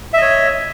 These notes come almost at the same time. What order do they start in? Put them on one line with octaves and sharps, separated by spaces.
E5 D#5 C#5